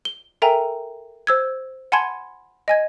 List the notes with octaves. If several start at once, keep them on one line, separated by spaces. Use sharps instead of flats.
G7
A4 A#4 E5 G5 G#5 A#5
C5 E6 G#6
F#5 G#5 A5 B5 C6 G#6
D#5 G#5 G#6